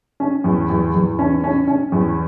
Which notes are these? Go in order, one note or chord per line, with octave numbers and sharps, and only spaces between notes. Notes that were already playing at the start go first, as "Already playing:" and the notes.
C#4
E2
E2
E2
C#4
C#4
C#4
E2